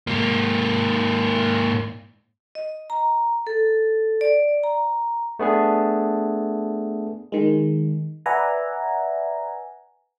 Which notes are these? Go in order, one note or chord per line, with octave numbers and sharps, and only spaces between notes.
G#2 A#3
D#5
A#5
A4
D5
A#5
A3 B3 D4 G#4
D#3 G#3
B4 D5 E5 F#5 G#5 A#5